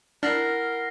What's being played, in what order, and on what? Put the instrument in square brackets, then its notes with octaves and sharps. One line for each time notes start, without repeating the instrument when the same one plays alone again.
[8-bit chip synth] D4 [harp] E4 F#5 [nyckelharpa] A#4 [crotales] F6 A#6 C7